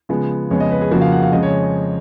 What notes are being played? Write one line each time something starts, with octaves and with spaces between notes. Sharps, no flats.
C#3 F3 G#3 B3
F2 C#3 G#3 B3 C#5
D#5
B4
G#4
F2 C#3 F3 A#3 F#4
F5
F#5
F5
F2 C#3 G#3 D#5
C#5